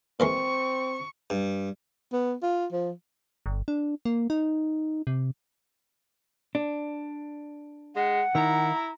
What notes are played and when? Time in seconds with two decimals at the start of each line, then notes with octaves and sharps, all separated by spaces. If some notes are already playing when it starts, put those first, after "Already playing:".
0.20 A#2 E3 G#3 C4 C#6
1.30 G2
2.13 B3
2.43 F4
2.72 F3
3.46 G1
3.68 D4
4.05 A#3
4.30 D#4
5.07 C3
6.55 D4
7.96 G#3 F#5
8.35 D#3 E4 A#5